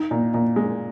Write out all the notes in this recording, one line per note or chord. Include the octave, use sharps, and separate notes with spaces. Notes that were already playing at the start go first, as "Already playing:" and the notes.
Already playing: D#4
A#2
A#2
G#3